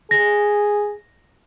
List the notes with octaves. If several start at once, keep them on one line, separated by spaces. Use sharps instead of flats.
G#4 A#6